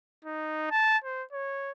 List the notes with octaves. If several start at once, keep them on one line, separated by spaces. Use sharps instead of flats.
D#4
A5
C5
C#5